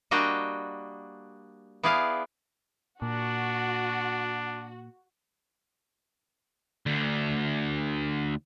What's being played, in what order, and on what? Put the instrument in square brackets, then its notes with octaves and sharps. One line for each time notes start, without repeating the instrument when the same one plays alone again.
[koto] G3 A#3 D4 F#4 D#5 G5
B3 E4 G#4 D5 F5
[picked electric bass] A#2 [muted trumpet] D4 [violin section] F#4
[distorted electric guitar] D2 D3